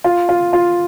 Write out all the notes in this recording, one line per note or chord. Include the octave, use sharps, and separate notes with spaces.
F4
F4
F4